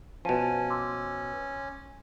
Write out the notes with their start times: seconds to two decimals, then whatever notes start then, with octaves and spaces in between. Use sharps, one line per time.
0.25 B2 F3 C#4 G#5 A5 D#7
0.70 C6 D6 E6